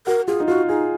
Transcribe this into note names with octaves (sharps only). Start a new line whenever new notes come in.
F#4 A#4
F4 G#4
D#4
F4 F#4
D#4 G#4